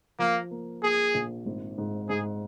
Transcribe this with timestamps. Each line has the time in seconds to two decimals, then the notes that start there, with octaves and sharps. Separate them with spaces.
0.19 F3 A#3
0.51 A#3
0.82 A#3 G#4
1.14 A#1
1.46 G#1
1.78 G#2
2.09 G#2 G#4